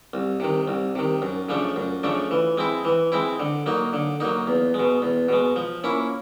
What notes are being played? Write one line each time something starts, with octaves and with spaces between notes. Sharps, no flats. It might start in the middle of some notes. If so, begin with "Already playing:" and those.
C2
C3 D#3
C2
C3 D#3
F#2
C#3 F3 A3 D4
F#2
C#3 F3 A3 D4
E3
G#3 C4 E4
E3
G#3 C4 E4
D3
F#3 A#3 D#4
D3
F#3 A#3 D#4
E2
G#3
B2
E2
B2 G#3
F3
A#3 C#4 E4